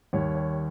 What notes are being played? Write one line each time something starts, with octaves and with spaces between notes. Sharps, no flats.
D#2 D#3 G3 C#5
C#5